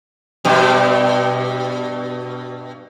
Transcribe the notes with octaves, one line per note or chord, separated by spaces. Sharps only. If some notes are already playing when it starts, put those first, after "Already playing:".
G2 B2